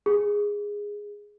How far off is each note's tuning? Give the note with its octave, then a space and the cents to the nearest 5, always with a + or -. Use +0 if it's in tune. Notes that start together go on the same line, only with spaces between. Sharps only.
G#4 -10